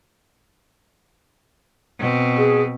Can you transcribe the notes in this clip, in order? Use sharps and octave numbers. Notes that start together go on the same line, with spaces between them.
B2 C4
G#4